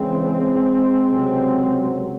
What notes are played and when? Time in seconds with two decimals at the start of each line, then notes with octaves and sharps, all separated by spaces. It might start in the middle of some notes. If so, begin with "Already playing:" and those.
Already playing: E2 C#3 E3 G#3 C4
1.10 C#2 C3 F#3